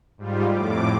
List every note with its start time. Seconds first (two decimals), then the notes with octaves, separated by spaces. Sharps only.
0.18 G#2 G3 F4
0.50 F2 A2 D6